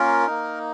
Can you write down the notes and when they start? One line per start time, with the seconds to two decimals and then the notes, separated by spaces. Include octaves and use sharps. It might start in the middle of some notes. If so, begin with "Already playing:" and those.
Already playing: A#3 C#4 F4 A#4
0.27 A#3 D#4